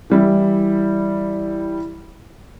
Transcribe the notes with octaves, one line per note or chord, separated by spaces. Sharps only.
E3 G3 E4